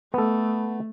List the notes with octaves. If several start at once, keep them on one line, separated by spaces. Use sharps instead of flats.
A3 B3 A4